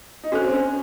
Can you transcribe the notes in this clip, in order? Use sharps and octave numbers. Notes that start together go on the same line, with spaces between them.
D#4
C#4 F#4 A4 C5
C4
C#4